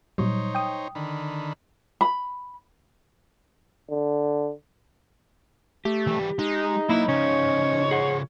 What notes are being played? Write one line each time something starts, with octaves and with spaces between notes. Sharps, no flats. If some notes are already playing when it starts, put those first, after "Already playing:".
A#2 F#3 G3 D#4 C5 C#5
G5 D#6
D3 D#3 B5
B5
D3
A3 G4
E3 G3
G#3 D#4
F#3 A#3 E4 B4
C#3 F3 C#4 C#5
G#4 F#5